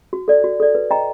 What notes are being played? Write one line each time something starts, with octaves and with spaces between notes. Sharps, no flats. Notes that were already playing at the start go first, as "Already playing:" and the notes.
F#4
A4 D5
F#4
A4 D5
B4
D#5 G5 A#5